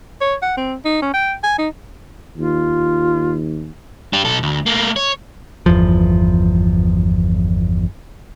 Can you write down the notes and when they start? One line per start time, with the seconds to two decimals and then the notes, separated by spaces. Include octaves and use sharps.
0.21 C#5
0.42 F#5
0.57 C4
0.85 D#4
1.02 C#4
1.14 G5
1.44 G#5
1.58 D#4
2.37 D#2 F4
4.13 D4 G4
4.25 B1 A4
4.43 D2
4.66 A3 A#3
4.96 C#5
5.66 G1 E2 F3